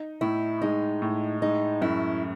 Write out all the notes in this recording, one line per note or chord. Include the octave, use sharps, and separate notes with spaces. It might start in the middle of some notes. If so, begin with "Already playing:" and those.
Already playing: D#4
A2 E4
G#3 D#4
A2
G#3 D#4
F#2 E4